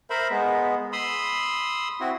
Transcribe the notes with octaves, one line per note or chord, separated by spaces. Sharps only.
A#4 C5 E5 B5
G#3 B3
B5 C6 D#6 E6
C4 E4 F#4